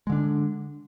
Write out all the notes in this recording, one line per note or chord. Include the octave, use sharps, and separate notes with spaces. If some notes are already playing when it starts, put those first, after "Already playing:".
D3 G#3 D4